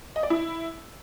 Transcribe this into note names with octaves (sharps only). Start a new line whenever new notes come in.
D#5
D5
E4